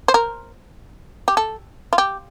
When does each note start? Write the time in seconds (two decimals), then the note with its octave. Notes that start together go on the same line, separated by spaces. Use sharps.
0.08 C5
0.14 A#4
1.28 G4
1.37 A4
1.93 F4
1.98 G4